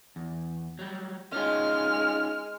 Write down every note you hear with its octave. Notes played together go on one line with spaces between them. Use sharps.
E2
F#3 G3
G#3 C#4 D#4 F4 F6